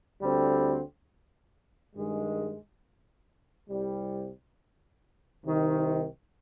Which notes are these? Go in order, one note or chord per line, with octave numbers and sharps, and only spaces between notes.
D2 D3 G3 C4
G2 D#3 G#3
C2 C3 G3
C2 C3 D#3